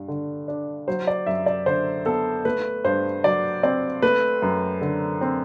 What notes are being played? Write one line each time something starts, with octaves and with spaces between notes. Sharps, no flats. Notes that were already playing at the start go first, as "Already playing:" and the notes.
Already playing: G2
D3
D4
F#3 C5
D5
F#2 E5
D5
D3 C5
B3 A4
A3 B4
G2 C5
F#3 D5
C4 D5
A3 B4
F#2
D3
C4